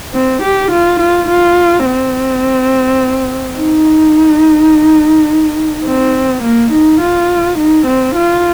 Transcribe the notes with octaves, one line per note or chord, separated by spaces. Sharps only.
C4
G4
F4
F4
F4
C4
D#4
C4
A#3
D#4
F4
D#4
C4
F4